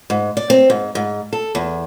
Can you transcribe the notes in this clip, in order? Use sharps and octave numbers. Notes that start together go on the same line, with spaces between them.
G#2
D5
C4
G#2
G#2
A4
E2